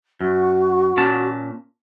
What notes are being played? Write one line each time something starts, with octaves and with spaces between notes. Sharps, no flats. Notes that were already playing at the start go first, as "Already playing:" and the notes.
F#2 F#4
A#2 C#4 A5